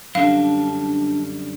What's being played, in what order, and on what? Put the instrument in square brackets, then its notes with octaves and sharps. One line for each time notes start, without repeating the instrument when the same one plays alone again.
[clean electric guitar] F#2 D3 G3 [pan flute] D4 [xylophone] F5